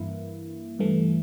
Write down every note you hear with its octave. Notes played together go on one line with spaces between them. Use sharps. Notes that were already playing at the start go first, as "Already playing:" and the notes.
Already playing: G2 E3 A#3 E4
G2 E3 A3